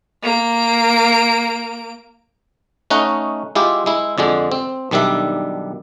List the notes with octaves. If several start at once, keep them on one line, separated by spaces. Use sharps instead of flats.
A#3 D7
A3 C#4 D#4 D#5 F#5
G#3 E4 F4 G4
G#3 E4
F2 D3 G#3 D4
C4
B1 D#3 G3 D4 E5